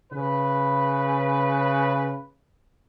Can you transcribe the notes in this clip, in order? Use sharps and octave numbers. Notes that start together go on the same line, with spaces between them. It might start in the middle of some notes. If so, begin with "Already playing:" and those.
C#3 B4